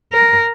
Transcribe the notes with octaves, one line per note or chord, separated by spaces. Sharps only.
A#4